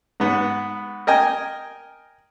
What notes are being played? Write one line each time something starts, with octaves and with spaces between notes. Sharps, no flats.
G#2 B3
A#4 D#5 G5 G#5